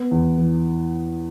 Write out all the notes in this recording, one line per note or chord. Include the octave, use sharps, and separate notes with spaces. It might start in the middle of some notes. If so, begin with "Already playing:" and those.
Already playing: B3
E2
E3